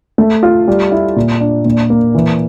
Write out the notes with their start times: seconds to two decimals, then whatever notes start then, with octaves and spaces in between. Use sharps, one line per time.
0.18 A3
0.43 F4
0.68 G3
0.92 E4
1.16 A#2
1.40 D4
1.65 A#2
1.90 A#3
2.15 E3